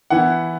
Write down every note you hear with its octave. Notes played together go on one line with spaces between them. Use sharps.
E3 B3 E4 F#5